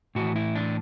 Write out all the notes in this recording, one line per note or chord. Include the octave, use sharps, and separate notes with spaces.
A2 E3 F#4
E4
D4